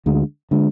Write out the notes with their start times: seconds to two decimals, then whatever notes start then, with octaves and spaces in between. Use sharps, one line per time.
0.06 D2 D3 G#3
0.51 D3 G#3